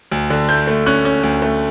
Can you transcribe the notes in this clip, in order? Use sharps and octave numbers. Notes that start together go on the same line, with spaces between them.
D2
D3
A3 G6
A3
C#4 F#6
C#4
D2
A3